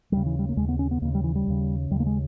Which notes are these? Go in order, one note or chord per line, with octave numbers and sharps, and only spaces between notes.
D#2 C#3 G3
E3
G3
A#3
D#2 C#3 G#3
B3
C#4
B3
D#2 C#3 A#3
G3
E3
G3
D#2 C#3
D#2 C#3 G3
A#3
G#3